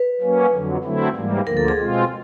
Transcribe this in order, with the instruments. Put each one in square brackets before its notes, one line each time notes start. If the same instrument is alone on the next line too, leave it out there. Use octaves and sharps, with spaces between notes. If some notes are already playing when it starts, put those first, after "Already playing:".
Already playing: [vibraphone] B4
[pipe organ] F#3 A#3 C#4
F2 D3 F#3
D3 F#3 A3 C4 E4
G#2 E3 G3 A#3
[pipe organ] D2 D3 F3 A#3 [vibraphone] A#4
[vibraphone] A4
G#4
[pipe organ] B2 G#3 C4 F4